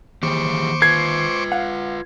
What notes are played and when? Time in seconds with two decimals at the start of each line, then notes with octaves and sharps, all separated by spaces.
0.23 D#2 E3 G4 G#4 C5 C#6 D6
0.82 F4 B4 G#6 C7
1.52 F5 F#5